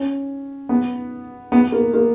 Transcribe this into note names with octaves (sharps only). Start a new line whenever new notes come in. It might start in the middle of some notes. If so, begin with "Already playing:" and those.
Already playing: C#4
B3
B3
A#3
A#3